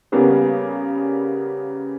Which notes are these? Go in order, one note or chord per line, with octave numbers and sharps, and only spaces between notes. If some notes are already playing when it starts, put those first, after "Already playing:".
C#3 G3 A#3 B3 G#4